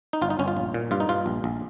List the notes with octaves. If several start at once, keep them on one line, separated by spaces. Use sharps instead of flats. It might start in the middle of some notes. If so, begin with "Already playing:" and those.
D#4
G1 F4
D#4
G1 C#4
F4
A#1
A#2
G2 F4
D#4
G2 F4
A#1
A#1